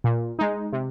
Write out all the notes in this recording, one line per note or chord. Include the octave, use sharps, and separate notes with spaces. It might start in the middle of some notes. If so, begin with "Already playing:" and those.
A#2
G#3 D#4
C3